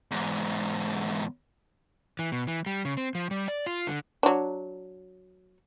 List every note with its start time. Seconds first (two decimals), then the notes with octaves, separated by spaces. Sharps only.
0.11 E2 G#2
2.19 E3
2.32 B2
2.48 E3
2.66 G3
2.85 C#3
2.97 C4
3.15 F3
3.31 G3
3.48 D5
3.66 F4
3.87 D3
4.23 F#3 D4